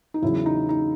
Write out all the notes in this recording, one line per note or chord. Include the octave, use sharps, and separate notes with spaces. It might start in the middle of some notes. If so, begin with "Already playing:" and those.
D#4
E2 C#3 F#3 E4
D#4
D#4